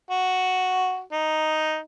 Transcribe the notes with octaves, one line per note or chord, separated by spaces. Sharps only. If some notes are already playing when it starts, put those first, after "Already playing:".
F#4
D#4